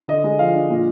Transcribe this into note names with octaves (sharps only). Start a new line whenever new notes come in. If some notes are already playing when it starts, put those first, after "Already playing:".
D3 D#5
G#3
F3 F5
D4
A#2